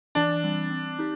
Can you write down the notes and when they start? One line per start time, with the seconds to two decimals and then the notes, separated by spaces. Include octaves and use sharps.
0.15 E3 D4
0.43 G3 C4
0.70 C4
0.99 D#4 G4